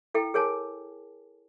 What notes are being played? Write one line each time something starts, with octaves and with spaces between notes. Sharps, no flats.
E4 A4 G5
G#4 A#4 C#5 G#5 A5